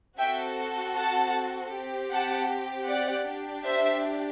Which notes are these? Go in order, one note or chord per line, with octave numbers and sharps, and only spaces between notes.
C4 F#4 A4 E5 G5
F#5 A5
C4 G4
F#5 A5
D5 F#5
D4 G4
C5 E5